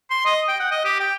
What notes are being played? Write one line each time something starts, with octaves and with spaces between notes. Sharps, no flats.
C6
D#5
G5
F#5
D#5
G4
G5